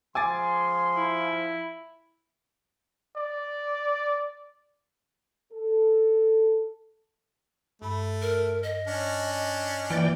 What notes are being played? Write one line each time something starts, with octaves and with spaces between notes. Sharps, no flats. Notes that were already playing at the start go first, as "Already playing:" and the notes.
F3 G#4 G#5 C6 D6 A6
E4
D5
A4
G2 A3 B5
A#4
D#5
C#4 D4
E3 A#3 F4 D5 G5